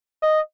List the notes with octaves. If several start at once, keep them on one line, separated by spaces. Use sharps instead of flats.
D#5